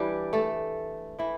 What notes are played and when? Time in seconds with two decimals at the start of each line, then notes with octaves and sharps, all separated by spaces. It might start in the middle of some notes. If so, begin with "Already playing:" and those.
Already playing: E3 G3 D4 E4 G4
0.33 A3 A4
1.19 E3 E4